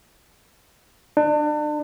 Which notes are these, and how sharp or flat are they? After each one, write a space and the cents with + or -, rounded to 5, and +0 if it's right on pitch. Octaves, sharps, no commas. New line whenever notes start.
D4 +35